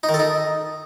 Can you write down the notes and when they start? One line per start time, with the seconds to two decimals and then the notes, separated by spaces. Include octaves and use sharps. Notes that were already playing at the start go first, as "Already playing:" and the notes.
0.03 D#4
0.09 D#3
0.14 A4
0.19 D#4